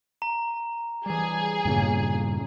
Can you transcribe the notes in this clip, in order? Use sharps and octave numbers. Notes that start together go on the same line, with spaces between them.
A#5
E3 G3 G#4
E2 G2 A#2 C#3 A#3